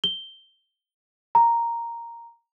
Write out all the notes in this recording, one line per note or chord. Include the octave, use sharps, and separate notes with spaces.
G7
A#5